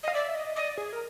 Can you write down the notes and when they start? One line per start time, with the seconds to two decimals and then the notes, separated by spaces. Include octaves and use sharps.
0.03 D#5 F5
0.13 D5 E5
0.35 D#5
0.56 D5 D#5
0.77 G#4
0.93 A#4